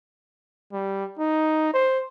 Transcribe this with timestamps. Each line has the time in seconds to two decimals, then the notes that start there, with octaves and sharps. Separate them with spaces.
0.72 G3
1.19 D#4
1.73 C5